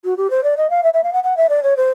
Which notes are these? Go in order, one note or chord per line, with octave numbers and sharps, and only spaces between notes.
F#4
G4
C5
D5
D#5
F5
E5
E5
F5
F#5
F#5
E5
D5
C#5
C5